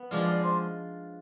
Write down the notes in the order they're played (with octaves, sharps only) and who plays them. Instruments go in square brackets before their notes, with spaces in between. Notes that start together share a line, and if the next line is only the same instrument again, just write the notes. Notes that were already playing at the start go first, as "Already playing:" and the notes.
Already playing: [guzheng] B3
[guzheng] F3 G#3 D4 F4 [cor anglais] D5
[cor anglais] D5
C5